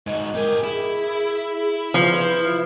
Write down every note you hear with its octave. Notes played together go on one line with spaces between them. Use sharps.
G#2 F#4 D#5
G4 G#4 A#4
E4 G#4
F3 B4